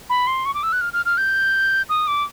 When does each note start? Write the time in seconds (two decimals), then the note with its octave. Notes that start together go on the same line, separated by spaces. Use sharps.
0.10 B5
0.27 C6
0.45 C#6
0.54 D6
0.63 E6
0.72 F#6
0.81 F6
0.93 F6
1.05 F6
1.17 G6
1.89 D#6
2.07 D6